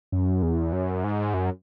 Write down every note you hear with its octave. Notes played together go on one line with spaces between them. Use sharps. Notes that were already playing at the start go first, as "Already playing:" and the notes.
F#2
E2
F#2
G#2
F#2